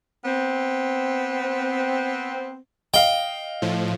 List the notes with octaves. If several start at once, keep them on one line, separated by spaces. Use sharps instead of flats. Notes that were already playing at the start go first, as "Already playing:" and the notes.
B3 C4
D#5 F5 G5
A2 F3